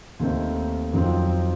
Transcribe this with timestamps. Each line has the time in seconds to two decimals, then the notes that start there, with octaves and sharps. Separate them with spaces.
0.20 D#2 D#3 A3 C4 D#4
0.93 F2 D#3 F#3 C4 F4